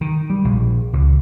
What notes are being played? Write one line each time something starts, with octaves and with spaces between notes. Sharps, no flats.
D#3
G3
A#1
C#2